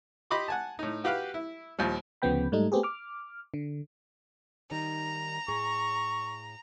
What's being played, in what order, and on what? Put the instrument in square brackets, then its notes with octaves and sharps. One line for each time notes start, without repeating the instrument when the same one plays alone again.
[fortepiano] G4 D#5 B5 C6 D6 D#6
F#5 G#5 A5
A2 D#4
F#4 G4 B4 F5 G5 F#6
E4
D#2 A#2 F3 G3
[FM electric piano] D2 C#3 F3 B3 G5 B5
G#2 G3 A3 D#4
A3 B3 C4 G4 G#4
D6 F6
D3
[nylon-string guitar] D#3 G3 D#4 [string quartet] A#5
[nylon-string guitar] A2 G#4 [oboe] C#6